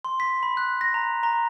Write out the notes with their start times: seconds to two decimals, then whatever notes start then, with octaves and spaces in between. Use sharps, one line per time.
0.05 C6
0.20 B6
0.43 B5
0.57 F#6
0.81 A#6
0.94 A#5
1.23 A#5